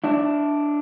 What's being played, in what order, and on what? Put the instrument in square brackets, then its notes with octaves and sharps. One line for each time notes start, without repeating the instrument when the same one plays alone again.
[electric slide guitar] D4 E4